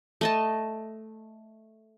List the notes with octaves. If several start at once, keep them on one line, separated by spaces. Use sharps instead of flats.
A3 D#5 A5